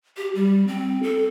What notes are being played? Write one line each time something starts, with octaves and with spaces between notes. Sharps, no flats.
G4
G3
C4
A4